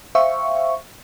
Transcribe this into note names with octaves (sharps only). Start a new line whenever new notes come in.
C5 E5 F5 G5 C#6